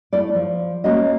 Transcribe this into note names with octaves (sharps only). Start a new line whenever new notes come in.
A3 E4 D5
F3
A3 A#3 C#4 F#4 D#5